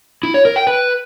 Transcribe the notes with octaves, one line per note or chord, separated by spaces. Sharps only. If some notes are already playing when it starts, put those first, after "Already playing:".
E4
C#5
A#4
G5
B4